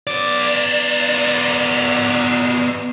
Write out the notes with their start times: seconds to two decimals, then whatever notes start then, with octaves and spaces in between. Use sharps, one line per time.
0.07 B3 D5